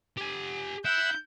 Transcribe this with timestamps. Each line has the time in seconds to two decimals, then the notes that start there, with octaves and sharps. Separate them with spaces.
0.17 G4 G#5
0.85 E4 F#5 E6 G6